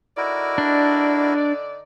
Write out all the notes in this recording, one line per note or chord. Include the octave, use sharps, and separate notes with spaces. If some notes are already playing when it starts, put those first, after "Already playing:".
D3 D#4 E4 F#4 A#4 D5
D4